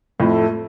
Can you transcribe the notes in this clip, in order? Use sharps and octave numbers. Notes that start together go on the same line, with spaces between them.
F2 A2 A3